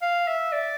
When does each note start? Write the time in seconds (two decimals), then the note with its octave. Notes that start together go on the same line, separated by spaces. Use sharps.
0.02 F5
0.27 E5
0.52 D5